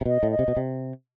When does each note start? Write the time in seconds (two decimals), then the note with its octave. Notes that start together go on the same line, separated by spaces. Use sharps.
0.01 C3
0.06 B2 D#5
0.23 A2
0.31 D#5
0.39 C3
0.48 B2
0.57 C3